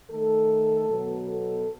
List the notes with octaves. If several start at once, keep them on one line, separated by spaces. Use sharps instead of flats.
D#3 A3 A4
B2 F#3 B3
A4